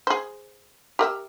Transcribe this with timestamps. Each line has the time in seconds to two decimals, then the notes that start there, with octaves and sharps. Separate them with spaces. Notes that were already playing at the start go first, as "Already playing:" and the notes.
0.07 G#4 C5
0.99 G4 A#4 E5